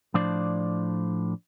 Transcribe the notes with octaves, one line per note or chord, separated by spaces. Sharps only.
A2 F3 D4 C5 D5